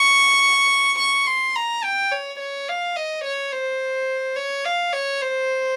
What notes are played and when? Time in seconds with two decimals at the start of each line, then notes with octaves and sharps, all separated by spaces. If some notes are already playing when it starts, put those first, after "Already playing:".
Already playing: C#6
0.99 C#6
1.27 C6
1.55 A#5
1.84 G5
2.12 C#5
2.40 C#5
2.69 F5
2.96 D#5
3.24 C#5
3.52 C5
4.37 C#5
4.65 F5
4.93 C#5
5.22 C5